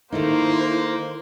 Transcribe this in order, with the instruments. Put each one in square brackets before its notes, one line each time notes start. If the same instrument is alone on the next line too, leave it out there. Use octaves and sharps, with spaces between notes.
[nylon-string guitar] D#3 A3 D#4 [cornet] A#3 [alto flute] E4 [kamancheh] C5